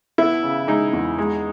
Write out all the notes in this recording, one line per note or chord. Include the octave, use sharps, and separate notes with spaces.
B3 E4
C#3
G#3 D#4
E2
G#3